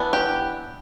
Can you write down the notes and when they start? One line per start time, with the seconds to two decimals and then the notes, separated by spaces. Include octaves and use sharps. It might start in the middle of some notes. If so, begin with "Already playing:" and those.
Already playing: E3 B3 D4
0.13 G4